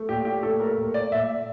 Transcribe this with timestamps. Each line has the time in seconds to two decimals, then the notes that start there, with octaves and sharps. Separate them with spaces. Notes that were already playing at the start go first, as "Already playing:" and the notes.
Already playing: A3
0.09 A#2 G4
0.25 G4
0.43 A3 A4
0.60 A#4
0.78 A#2
0.94 D5
1.12 A#2 E5